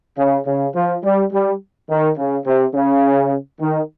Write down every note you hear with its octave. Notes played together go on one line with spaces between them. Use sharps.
C#3
C#3
F3
G3
G3
D#3
C#3
C3
C#3
D#3